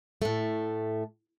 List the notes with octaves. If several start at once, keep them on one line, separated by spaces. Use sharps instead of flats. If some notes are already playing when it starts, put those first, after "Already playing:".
A2 A3